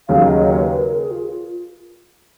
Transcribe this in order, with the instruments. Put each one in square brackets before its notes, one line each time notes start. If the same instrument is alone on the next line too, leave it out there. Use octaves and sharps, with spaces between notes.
[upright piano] D#2 C#3 F#3 [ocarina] F5
[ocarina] D#5
C#5
B4
A#4
G#4
F4
F4